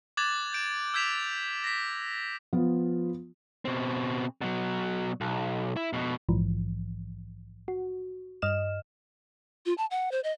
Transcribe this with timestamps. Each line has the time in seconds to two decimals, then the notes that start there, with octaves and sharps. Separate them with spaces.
0.17 D6 F#6 G#6 A6 E7 F#7
0.53 G6 D7 E7
0.94 E6 G6 G#6 B6 E7 F7
1.64 A#6 B6
2.53 F3 B3 F4
3.65 B2 C4
4.41 B2 F#3
5.21 B1
5.76 E4
5.93 F2 B2
6.29 A#1 G#2 E3 F3
7.68 F#4
8.42 G2 D#5 F6 E7
9.66 F4
9.78 A5
9.91 F#5
10.12 C5
10.24 D#5